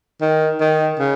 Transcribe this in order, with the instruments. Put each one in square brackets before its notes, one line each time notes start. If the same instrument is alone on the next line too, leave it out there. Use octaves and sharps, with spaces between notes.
[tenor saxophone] D#3
D#3
C#3